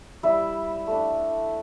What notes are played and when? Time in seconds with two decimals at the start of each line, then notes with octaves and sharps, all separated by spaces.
0.23 G3 E4 E5
0.87 A3 D4